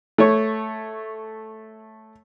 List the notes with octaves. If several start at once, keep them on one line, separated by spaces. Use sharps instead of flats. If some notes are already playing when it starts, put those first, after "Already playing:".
A3 C#5